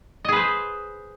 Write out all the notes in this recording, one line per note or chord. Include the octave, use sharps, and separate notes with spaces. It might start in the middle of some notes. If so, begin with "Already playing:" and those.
G#4 B4 C5 D#5